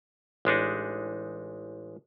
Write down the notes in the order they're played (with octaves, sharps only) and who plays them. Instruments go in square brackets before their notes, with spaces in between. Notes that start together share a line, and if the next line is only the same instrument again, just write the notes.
[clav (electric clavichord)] A1 G#3 D4 D#4